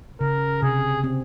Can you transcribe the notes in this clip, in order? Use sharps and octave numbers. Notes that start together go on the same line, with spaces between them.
C#3 A#4
C3 G#4
C4